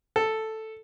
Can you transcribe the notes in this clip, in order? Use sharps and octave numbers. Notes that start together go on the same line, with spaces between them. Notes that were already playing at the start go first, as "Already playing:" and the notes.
A4